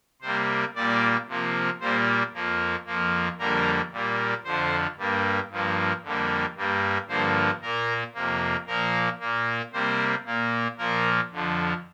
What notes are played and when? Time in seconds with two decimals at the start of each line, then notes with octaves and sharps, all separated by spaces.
0.21 C3 G3 A#3 C5
0.75 A#2 G3 A#3 D5
1.27 C3 F3 A#3
1.80 A#2 G3 A#3 C5
2.33 F2 F3 A#3
2.85 F2 F3 A#3
3.39 F2 D3 G3 A#3 A#4
3.92 A#2 G3 A#3
4.44 F2 D3 F3 C5
4.98 G2 G3 A#3
5.50 G2 F3 A#3
6.03 F2 D3 G3 A#3
6.55 G2 G3 A#3
7.08 G2 D3 F3 A#3 C5
7.62 A#2 A#3 A#4
8.14 F2 C3 A#3
8.67 A#2 F3 A#3 A#4
9.20 A#2 A#3
9.73 C3 G3 A#3 C5
10.25 A#2 A#3
10.78 A#2 F3 A#3 A#4
11.31 F2 D3 F3